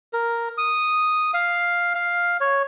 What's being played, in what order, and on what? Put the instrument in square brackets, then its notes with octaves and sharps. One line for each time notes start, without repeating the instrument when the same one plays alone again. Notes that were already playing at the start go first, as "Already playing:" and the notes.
[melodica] A#4
D#6
F5
F5
C#5